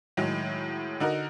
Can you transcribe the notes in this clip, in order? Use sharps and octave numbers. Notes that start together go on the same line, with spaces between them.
A2 D#3 F#3 G#3
D3 D#4 F#4 A#4